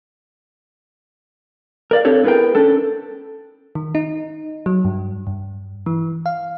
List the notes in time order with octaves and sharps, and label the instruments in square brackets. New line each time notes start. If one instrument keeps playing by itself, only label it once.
[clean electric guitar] A#4 D5 F5
C4 D4 G4 A4 C#5
B3 E4 G#4 A#4 G5
C#4 D4 A4
[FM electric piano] D#3
D#4
F#3
G2
G2
E3
F5